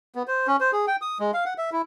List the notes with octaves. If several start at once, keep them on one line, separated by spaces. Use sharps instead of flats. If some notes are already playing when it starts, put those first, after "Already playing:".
B3
C5
C#4
C5
G#4
G5
D#6
G#3
F5
F#5
E5
E4